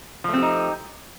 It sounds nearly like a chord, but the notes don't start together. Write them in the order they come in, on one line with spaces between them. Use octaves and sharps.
F3 A3 C4 G4 D#4